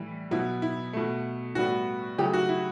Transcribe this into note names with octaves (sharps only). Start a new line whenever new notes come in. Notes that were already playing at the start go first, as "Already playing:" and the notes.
Already playing: A2 E3 G3
B2 F#3 B3 E4
E4
B2 A3
A2 G3 B3 F#4
C#3 F#3 A3 G4
F#4
E4